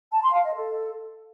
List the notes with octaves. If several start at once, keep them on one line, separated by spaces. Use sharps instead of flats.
A5
C6
F5
D#5
A4